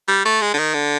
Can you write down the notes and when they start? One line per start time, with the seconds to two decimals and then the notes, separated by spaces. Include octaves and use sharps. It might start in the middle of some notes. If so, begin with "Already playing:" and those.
0.08 G3
0.25 A3
0.41 G#3
0.54 D3
0.58 D#3
0.74 D3